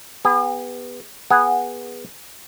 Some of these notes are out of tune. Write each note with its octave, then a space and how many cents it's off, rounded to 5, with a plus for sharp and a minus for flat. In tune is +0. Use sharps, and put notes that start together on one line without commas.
B3 +0 G#4 -45
B3 -15 G#4 -15 F#5 -5